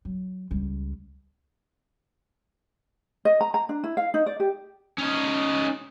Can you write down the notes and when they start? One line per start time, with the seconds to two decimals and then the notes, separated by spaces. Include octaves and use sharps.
0.05 F#3
0.51 C#2 G3
3.25 D#5
3.41 A#5
3.54 A#5
3.69 D4
3.84 E4
3.97 F5
4.14 D#4
4.26 D5
4.40 G4
4.98 C#4 D#4